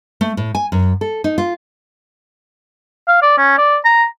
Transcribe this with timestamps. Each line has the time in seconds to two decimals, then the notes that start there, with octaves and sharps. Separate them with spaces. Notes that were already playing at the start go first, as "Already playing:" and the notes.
0.21 A3
0.37 A2
0.55 G#5
0.72 F#2
1.01 A4
1.24 D#4
1.38 F4
3.08 F5
3.22 D5
3.38 C#4
3.58 D5
3.85 A#5